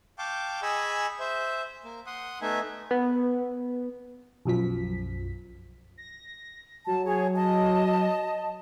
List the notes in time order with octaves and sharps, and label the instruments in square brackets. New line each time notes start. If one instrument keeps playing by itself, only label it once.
[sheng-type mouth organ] F5 G5 A5 C#6 D6
G#4 D#5 G#5 B5 C#6 E6
C5 E5
A#3
F#5 C6 D#6
A3 B3 D#4 E5 G#5
[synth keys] B3
[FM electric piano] B1 F#2 F3 B6
[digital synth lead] A#6
[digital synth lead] F#3 [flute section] A5
[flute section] G#4 C#5
D#5 A5